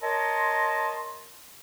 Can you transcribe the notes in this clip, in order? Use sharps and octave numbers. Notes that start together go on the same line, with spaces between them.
A#4 C#5 D#5 A5 A#5 C6